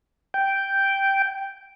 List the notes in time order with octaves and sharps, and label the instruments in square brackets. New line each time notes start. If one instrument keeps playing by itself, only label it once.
[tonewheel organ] G5